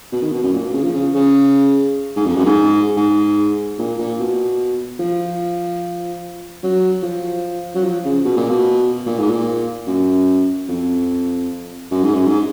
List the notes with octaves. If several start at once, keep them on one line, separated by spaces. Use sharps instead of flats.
B2
D#3
B2
F#2
A#2
B2
C#3
F3
C#3
C#3
G#2
F2
F#2
G#2
G#2
A#2
A#2
B2
F3
F#3
F3
F#3
F3
C#3
B2
A#2
B2
A#2
G#2
A#2
F#2
F2
F#2
G#2
F#2
G#2